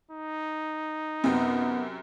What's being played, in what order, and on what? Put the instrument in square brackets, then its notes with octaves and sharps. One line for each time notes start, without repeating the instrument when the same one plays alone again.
[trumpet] D#4
[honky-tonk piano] F#2 C3 C4 [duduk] B3